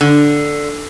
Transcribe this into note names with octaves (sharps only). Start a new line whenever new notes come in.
D3